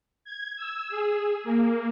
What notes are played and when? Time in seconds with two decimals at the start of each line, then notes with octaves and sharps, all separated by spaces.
0.25 G#6
0.57 E6
0.89 G#4
1.44 A#3